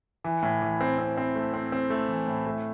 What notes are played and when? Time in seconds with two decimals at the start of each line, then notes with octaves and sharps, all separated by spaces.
0.24 E3
0.42 A2
0.62 E3
0.81 C4
0.98 C4
1.17 C4
1.35 A3
1.54 C4
1.72 C4
1.90 A3
2.08 E3
2.27 A2
2.46 A3